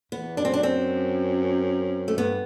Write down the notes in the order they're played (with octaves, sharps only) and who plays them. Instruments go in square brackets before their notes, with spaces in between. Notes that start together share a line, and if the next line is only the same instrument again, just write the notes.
[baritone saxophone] E2 [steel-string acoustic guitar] B3
[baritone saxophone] F#2 [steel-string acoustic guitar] D4
[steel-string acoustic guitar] C4
D4
C4
A3
[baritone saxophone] G2 [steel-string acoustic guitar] B3